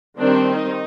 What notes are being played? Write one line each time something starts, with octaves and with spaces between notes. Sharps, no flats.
D#3 G3 C4 D4
D#4